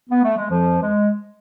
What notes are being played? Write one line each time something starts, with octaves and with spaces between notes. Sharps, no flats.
B3
A3
G#3
F2 F3
G#3